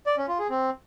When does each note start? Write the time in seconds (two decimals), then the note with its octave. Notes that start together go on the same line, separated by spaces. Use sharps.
0.06 D5
0.17 C#4
0.28 F4
0.39 G#4
0.50 C4